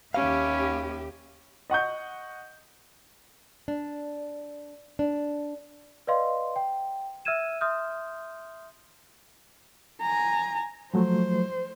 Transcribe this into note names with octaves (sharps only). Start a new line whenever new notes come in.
D#2 C#4 G4 E5 F5 B5
D#5 F#5 C#6 G6
D4
D4
B4 D5 D#5 F5 C6
G5
E5 E6 F6 G#6 D#7 E7
E5 C6 D#6 F6 G6
G#5 A#5
F3 F#3 A3 C5